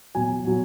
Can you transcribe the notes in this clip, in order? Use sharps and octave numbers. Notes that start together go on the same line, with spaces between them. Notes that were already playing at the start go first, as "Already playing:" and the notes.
B2 F#3 G#5
B2 F#3